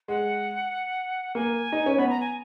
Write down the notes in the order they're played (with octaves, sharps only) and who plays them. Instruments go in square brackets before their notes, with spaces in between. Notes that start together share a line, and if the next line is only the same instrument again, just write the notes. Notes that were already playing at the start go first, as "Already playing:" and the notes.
[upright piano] G#3 [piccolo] F#5
[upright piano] A#3 [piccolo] G#5
[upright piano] D#4
C#4
[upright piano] B3 [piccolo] B5
[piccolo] A#5
G#5